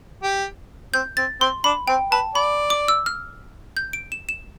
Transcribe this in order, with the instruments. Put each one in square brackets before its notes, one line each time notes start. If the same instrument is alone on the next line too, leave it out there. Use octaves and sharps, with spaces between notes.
[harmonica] G4
[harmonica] C4 [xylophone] G6
[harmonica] C4 [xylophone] A6
[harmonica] C4 [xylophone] C6
[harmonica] D4 [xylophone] B5
[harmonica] C4 [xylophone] G5
[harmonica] B4 [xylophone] A5
[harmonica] D5 [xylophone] B5
[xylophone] D6
E6
F6
G6
D7
E7
E7